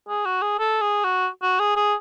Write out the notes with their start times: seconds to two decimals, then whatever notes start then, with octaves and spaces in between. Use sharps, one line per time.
0.09 G#4
0.26 F#4
0.42 G#4
0.59 A4
0.81 G#4
1.04 F#4
1.43 F#4
1.60 G#4
1.76 G#4